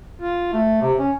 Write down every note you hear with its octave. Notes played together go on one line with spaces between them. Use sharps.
F4
A3
C3
C#4